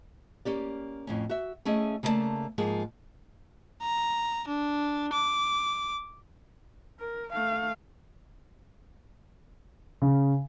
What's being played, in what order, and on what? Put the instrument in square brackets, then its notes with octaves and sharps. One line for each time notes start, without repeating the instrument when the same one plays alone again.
[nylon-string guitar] A#3 C#4 G4 D5
F2 A2 C#4
F#4 E5
A3 C#4 E4 G#4 D#5
C#3 A3 A#3 C#5 D5 A5
G#2 F3 A#3 G#4
[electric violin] A#5
D4
D6
[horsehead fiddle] A#4
A3 F5
[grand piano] C#3